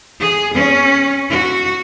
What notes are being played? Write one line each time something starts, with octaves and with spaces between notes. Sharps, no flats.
G#4
C#4
F#4